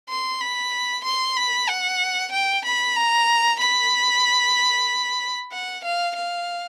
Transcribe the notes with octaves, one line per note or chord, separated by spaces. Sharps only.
C6
B5
C6
B5
F#5
G5
B5
A#5
B5
F#5
F5
F5